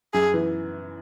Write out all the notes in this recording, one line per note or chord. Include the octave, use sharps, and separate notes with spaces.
F#2 G#4
E3 B3